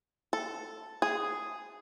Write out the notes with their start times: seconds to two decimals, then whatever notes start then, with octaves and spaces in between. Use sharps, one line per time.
0.33 A4
1.02 G#4